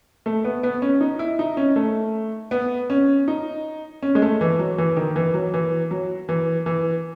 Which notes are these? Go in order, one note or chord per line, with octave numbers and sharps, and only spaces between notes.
A3
B3
B3
C#4
D#4
E4
D#4
C#4
A3
B3
C#4
D#4
C#4
G#3
A3
E3
F#3
E3
D#3
E3
F#3
E3
F#3
E3
E3